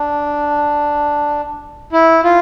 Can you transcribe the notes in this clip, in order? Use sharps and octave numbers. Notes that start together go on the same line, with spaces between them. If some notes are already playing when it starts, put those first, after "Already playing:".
Already playing: D4
E4
F4